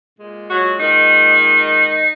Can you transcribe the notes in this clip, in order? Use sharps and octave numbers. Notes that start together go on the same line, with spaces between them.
A#2 G#3
F#3 F#4
D#3 D#4